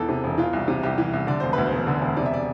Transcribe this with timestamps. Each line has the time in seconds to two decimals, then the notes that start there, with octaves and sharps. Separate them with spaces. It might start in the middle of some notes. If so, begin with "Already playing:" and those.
Already playing: E1 E2 E3 A4
0.09 C3
0.24 E1
0.38 E3 F4
0.53 C2
0.68 C3
0.83 C2 G4
0.98 E3
1.13 C2
1.27 D3 D5
1.40 E1 C5
1.53 D2 B4
1.66 C5
1.73 E1
1.87 D3
2.02 E1
2.17 C3 D5
2.26 E5
2.33 D5